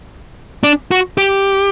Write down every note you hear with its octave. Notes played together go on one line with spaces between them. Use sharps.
D4
F#4
G4